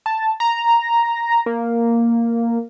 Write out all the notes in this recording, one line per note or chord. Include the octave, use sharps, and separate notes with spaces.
A5
A#5
A#3